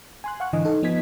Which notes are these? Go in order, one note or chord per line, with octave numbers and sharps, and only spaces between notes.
G#5 C6 F#6
F5 F#5 C#6 F#6
G#2 D3 E3 D#5 G#5
D#4 A4
F3 B3 D#5 G#6 B6